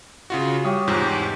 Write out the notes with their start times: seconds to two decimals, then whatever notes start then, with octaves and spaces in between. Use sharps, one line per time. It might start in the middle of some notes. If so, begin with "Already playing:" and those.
0.30 C#3 F4 F#4
0.65 G3 G4 C#5 C#6 D#6
0.88 E2 G#2 C3 F4